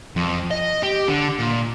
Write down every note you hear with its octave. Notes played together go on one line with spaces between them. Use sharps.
F2
D#5
G4
D3
A#2